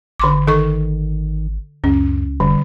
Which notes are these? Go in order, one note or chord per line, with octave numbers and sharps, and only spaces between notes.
G#1 D3 C6 D6
D#3 A4 C#6
C#2 F#2 C#4
F1 D3 G3